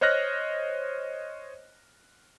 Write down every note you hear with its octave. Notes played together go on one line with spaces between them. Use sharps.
C5 C#5 D#5 F6 F#6 A#6